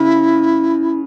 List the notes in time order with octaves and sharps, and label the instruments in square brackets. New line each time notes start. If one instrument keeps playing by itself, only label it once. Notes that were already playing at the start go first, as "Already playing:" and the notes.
Already playing: [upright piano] C#3 [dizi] E4